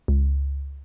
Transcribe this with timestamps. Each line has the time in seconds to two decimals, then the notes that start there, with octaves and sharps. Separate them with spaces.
0.08 C#2